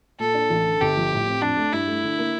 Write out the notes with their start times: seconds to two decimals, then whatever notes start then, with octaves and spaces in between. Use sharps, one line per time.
0.19 A#2 A4
0.34 D4
0.50 A1
0.66 D3
0.81 G1 G4
0.97 F3
1.12 A2
1.26 C4
1.42 F2 D4
1.57 A3
1.73 G2 E4
1.87 A3
2.04 D3
2.19 A#3